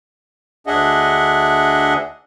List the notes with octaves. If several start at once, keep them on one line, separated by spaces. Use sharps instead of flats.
D2 D4 G#4 D#5 E5 F#5